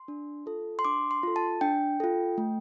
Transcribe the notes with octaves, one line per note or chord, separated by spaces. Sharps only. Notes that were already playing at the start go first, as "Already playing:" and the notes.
Already playing: C6
D4
F4 A4
C6
D4 D6
C6
F4 A4
A5
D4 G5
F4 A4
A3